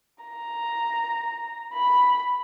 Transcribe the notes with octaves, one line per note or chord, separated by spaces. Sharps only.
A#5
B5